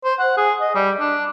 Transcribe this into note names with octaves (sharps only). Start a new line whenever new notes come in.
C5
F#5
G#4
D#5
G3
D4